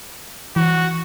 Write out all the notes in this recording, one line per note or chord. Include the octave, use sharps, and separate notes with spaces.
E3 F#4